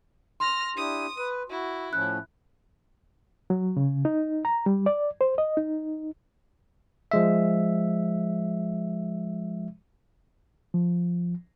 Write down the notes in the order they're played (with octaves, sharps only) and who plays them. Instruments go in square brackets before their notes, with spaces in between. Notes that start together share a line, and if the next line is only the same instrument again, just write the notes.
[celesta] C6 [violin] F6 A#6
[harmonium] D4 E4 G4 [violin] D#6
[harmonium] B4
[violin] E4 [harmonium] F#4
[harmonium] A2 F3 C#4 [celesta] F#6
[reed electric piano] F#3
C#3
D#4
A#5
G3
D5
C5
D#5
D#4
[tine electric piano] F3 G#3 E5
[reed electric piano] F3